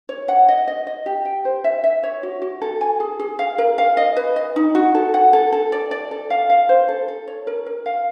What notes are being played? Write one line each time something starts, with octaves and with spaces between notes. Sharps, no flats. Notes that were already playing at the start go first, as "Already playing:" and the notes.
C#5
F#5
D#5
D#5
D#5
G4
G5
C5
E5
E5
C#5
F#4
F#4
A4
G#5
G#4
G#4
F5
A#4
F5
D#5
B4
D#5
D#4
F#4
A4
F#5
A4
A4
D5
D5
A4
F5
F5
C5
A4
A4
C#5
A#4
A#4
F5